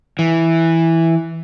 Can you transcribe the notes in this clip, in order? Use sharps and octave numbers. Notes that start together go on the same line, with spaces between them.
E3